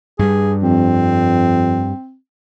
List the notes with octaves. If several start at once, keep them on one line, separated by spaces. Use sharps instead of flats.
G2 G3 G#4
F2 C4